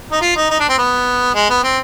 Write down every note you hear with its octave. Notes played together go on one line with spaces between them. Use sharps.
D#4
F4
D#4
D#4
D4
C4
B3
G#3
B3
C4